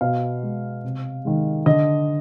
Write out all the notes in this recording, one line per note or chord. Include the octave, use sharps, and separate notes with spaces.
B2 F5
G#3
C3
D#3 G#3
D3 D#5